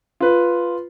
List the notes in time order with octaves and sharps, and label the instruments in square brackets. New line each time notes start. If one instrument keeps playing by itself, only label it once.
[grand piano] F4 B4